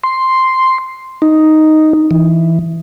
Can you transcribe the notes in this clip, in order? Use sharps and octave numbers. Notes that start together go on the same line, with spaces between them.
C6
D#4
E3